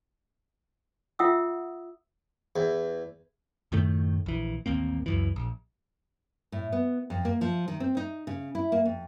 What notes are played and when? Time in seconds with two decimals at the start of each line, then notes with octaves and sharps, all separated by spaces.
1.19 F4 E5 F#5 D#6 E6
2.56 E2
3.72 F#2 A2 D#3 A3
4.26 A#1 E3
4.66 A1 D#2 A#3 C4
5.06 C#2 F#2 E3
5.36 A#1
6.52 A2
6.72 B3
7.10 F2
7.25 A#3
7.41 F3
7.68 D#3
7.80 C4
7.97 D#4
8.27 C#3
8.55 E4
8.72 A#3
8.85 F2